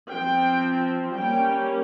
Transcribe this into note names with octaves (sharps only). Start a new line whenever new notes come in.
F3 C4 G5
G3 A#3 C#4 G5